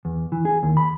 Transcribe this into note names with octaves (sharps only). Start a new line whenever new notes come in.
E2
E3
G#4
D#2
B5